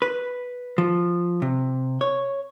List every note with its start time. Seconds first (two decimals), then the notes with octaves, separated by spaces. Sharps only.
0.02 B4
0.78 F3
1.42 C3
2.01 C#5